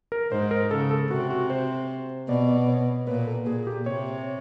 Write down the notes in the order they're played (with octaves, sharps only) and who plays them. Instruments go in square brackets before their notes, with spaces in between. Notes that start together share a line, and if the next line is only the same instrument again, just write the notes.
[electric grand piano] A#4
[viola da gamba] G#2 [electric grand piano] C5
[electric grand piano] A#4
[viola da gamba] C#3 [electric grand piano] A4
[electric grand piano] A4
[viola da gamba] C3 [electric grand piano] F#4
[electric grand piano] F#4
C5
[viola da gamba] B2 [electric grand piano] D5
[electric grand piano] D5
C#5
[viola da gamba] A#2 [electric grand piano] B4
[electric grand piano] A4
[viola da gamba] A#2 [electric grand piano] G#4
[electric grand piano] G4
[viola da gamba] C3 [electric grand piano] C#5